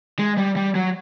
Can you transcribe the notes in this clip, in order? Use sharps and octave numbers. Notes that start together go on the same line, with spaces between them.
G#3
G3
G3
F#3